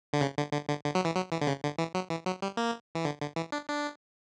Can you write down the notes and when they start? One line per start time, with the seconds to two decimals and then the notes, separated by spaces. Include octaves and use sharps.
0.13 D3
0.21 C#3
0.37 D3
0.52 D3
0.68 D3
0.84 D3
0.95 F#3
1.05 E3
1.15 F#3
1.31 E3
1.41 D3
1.47 C#3
1.63 D3
1.78 E3
1.94 F#3
2.10 E3
2.26 F#3
2.42 G3
2.57 A#3
2.95 E3
3.05 D3
3.21 D3
3.36 E3
3.52 D4
3.68 D4